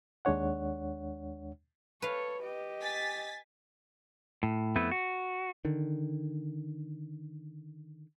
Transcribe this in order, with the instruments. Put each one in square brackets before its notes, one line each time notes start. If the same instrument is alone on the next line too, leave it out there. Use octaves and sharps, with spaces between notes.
[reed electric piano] D#2 G#3 D4 C#5 F#5
[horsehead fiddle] A4 C#5 [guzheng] B4 F5
[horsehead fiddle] G4 D#5
[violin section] G#5 A6 B6
[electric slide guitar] A2
F2 A3 B3 E4 B4
F#4
[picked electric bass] D3 D#3